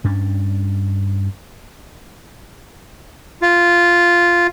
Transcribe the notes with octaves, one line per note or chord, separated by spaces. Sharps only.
G2 C#4 D4
F4